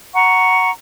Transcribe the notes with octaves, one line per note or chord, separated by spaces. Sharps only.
F#5 A#5 C#6